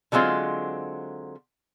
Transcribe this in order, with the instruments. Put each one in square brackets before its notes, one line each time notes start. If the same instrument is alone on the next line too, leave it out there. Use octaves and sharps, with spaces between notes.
[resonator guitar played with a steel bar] D3 F#3 G#3 C4 F4